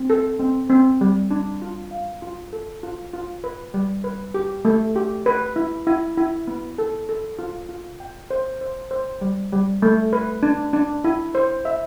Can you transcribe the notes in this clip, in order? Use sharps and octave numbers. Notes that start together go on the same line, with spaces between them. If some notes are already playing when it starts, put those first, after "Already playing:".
Already playing: C4
A4
C4
C4
G3
D4
F4
F5
F4
A4
F4
F4
B4
G3
B4
G4
A3
G4
B4
E4
E4
E4
B3
A4
A4
F4
F4
G5
C5
C5
C5
G3
G3
A3
B4
D4
D4
E4
C5
E5